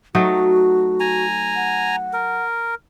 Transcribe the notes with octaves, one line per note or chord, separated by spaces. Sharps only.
F#3 A3 D#4 F#4
G#5 A#5
F#5
A#4